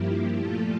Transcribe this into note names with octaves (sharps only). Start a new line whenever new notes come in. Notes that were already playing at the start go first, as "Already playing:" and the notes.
Already playing: G2 F3 A#3 E4 G4
A#2 F3 A3 F4 A4